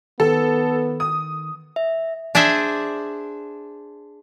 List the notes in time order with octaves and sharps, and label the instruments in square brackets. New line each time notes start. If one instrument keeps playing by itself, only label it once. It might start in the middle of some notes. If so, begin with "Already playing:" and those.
[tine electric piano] D#3 [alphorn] B3 [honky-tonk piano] A4
[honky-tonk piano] D#6
[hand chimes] E5
[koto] D4 G#4 C5 E5 G#5